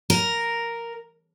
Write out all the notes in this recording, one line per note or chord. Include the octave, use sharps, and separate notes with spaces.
A#4